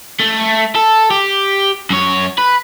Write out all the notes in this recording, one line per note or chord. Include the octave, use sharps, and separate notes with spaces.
A3
A4
G4
F#2 C#5
B4